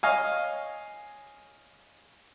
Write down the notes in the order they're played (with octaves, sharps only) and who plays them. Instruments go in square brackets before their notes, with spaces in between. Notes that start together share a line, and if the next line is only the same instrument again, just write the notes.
[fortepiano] C#5 D#5 F5 G#5